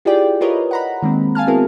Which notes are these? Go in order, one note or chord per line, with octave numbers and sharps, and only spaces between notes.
E4 F4 G4 G#4 D5 G5
F4 G4 A#4 B4 C#5 D#5
F#5 A#5 B5
D#3 G#3 A#3 C4
F5 G#5 A5 F6
B3 C4 E4 F#4 G#4 A#4